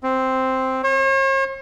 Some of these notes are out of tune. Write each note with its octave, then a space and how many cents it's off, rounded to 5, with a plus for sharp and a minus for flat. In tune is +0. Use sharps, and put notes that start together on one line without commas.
C4 +0
C#5 -45